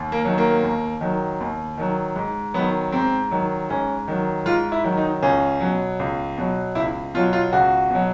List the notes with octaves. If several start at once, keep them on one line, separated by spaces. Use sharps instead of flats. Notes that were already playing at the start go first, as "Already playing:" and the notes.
Already playing: D#2
A#3
D#3 F#3
A#3
D#2
D#3 F#3
D#2
D#3 F#3
G#2
D#3 F#3 B3
G#2 C4
D#3 F#3
G#2 C#4
D#3 F#3
G#2 F4
E4
D#3 F#3
D#4
C#2 C#4
B2 F#3
C#2
B2 F#3
C#2 E4
B2 F#3 F4
F4
C#2 F#4
B2 F#3